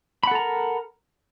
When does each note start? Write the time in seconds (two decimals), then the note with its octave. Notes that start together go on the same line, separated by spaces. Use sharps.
0.23 B5
0.27 F#5
0.31 A4
0.35 A#5
0.39 A#4